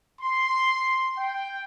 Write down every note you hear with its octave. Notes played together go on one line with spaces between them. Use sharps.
C6
G5